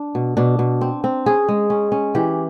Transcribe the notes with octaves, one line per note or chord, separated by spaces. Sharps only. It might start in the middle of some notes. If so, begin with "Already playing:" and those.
Already playing: D4
B2
B2 D4
B2
C4
C4
C#4 G#4
G#3
C#4
C#4
E3 G4